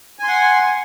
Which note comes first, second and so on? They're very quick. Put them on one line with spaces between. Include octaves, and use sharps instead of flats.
G#5 C6 F#5